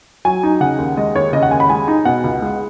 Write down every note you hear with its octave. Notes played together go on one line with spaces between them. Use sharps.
F#3 G#5
D#4
C#3 F#5
D#2
G#3 D#5
D#2 C#5
C#3 D#5
F#5
D#2 G#5
B5
G#3 G#5
D#4
B2 F#5
C#2
G#3